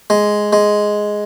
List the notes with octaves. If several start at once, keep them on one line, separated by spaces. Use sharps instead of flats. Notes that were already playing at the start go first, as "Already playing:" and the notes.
G#3
G#3